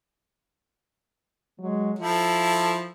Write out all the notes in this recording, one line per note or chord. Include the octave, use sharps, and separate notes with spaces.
F#3 G#3
F3 E4 F4 A4